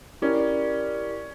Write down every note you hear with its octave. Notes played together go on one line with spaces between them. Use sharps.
C#4 E4 G4 A#4 D5